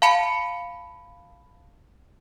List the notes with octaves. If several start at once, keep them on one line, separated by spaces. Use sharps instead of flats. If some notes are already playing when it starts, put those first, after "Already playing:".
F5 A5 B5 C#7